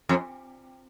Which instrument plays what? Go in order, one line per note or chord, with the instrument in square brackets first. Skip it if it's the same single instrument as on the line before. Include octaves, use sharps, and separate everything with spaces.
[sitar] F2